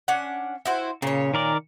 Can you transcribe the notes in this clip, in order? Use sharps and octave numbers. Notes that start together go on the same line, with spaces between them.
C#4 D4 F#5
E4 F#4 C5
A#2 C#3 C#5
D#3 A#4 D5